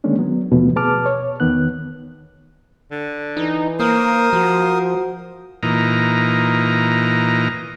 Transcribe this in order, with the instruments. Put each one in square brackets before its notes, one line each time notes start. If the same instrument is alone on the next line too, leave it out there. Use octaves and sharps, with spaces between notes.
[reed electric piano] D3 D#3 G#3 A#3 C#4 D4
F#3 B3
D#2 B2 E3 F3 A3
B2 G#4 B4 A5 D6 F6
C#5
E2 D#3 B3 F#6
[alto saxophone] D3
[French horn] E3 [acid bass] D#4
[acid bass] A#3 [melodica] A#4 D#6 [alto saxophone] C5
[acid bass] F3 [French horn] F#4
[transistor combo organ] A#2 E3 D#4 A#5